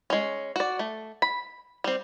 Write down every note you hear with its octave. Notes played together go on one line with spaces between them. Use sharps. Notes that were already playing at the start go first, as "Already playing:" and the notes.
G#3 C#4
F#4 D5
A3
B5
G3 C4